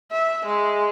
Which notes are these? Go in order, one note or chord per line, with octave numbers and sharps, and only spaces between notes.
E5
G#3